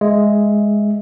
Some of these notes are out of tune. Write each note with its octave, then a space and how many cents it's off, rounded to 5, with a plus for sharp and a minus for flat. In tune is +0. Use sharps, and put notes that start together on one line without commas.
G#3 +0 E5 +0